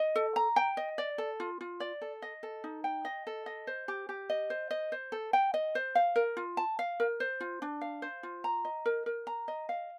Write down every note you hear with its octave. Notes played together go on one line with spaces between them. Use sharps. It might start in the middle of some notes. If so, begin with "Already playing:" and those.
Already playing: D#5
A4
A#5
G5
D#5
D5
A4
F4
F4
D5
A4
D#5
A4
D#4
G5
D#5
A4
D#5
C5
G4
G4
D#5
C5
D#5
C5
A4
G5
D#5
C5
F5
A#4
F4
A5
F5
A#4
C5
F4
D4
F5
C5
F4
A#5
D#5
A#4
A#4
A#5
D#5
F5